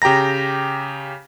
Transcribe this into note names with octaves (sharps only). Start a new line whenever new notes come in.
C#3 G4 G5 A#5 A#6